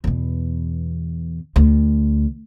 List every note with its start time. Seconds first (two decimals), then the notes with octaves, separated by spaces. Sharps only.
0.04 E2 B2
1.56 D2